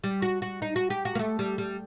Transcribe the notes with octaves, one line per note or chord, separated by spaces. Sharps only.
G3
F#4
F#4
D#4
F#4
G4
F#4
A#3
A3
G3
G3